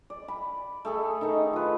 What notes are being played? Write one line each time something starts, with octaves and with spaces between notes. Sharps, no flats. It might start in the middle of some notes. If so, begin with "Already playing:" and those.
D5
B5
A3 G#4 A4
D#3 D#4
F4 B4